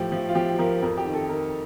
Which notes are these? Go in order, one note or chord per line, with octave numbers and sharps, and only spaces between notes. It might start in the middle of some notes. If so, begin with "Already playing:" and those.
Already playing: A2 F3 G4
F3
F4
F3 G4
F3 A#4
F2 A#4
G4
D#3
A4
D#3 A#4